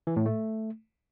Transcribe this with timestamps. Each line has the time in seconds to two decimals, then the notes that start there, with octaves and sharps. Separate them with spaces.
0.07 E3
0.16 A2
0.26 A3